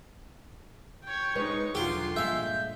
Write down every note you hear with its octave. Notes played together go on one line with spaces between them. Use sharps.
C#5 G5
G#3 D#4 B4 C#5 C#6
E1 D3 F#3 F4 G4 C6
G2 A#2 G#3 E5 F5 G6